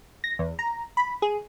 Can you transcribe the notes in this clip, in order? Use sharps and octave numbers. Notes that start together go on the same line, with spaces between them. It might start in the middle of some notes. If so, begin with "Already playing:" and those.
A#6
E2
A#5
B5
G#4